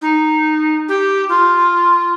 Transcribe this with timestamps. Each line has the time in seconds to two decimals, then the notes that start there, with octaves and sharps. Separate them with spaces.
0.02 D#4
0.88 G4
1.29 F4